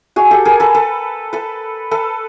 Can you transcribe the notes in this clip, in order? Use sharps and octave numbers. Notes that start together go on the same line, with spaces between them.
F#4 G#4
G4 A4
G#4 A#4
A4 B4
A4 B4
A4 B4
A4 B4